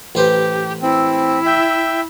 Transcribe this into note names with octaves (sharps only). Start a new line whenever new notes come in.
A1 G4 B4 C5
C4 E4
E5 G5